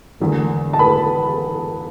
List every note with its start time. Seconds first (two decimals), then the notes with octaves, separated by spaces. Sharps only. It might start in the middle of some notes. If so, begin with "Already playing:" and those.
0.20 E1 E2 D3 A3
0.73 A5
0.79 B4 B5